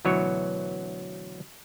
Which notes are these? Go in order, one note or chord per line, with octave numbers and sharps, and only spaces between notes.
D2 B2 E3 F#3 C#5